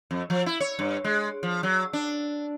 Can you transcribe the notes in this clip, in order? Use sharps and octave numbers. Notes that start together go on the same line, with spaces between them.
F2
F3
E4
C#5
G2
G#3
F3
F#3
D4